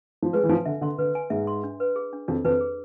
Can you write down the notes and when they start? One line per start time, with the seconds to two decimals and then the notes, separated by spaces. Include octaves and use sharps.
0.22 F3
0.33 G#3 B4
0.43 E3
0.49 F3 G#5
0.66 D3 E5
0.81 D3 C6
0.98 D3 B4
1.15 G#5
1.30 G#2 E5
1.47 C6
1.64 D4
1.80 B4
1.96 G#4
2.13 D4
2.28 F2 D4
2.45 F2 B4
2.61 G#4